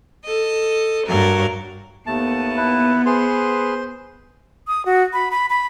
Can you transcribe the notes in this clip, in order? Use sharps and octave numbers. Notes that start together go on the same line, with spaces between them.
A4 D#5
G2 F#3 A#4
D#2 A3 B3 A5
E4 B4
G#4 B4 C5 C6
D#6
F#4
B5
B5
B5